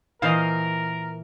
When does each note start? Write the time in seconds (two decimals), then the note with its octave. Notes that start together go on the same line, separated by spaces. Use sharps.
0.22 A#2 E3 A#4 C5 D#5 F5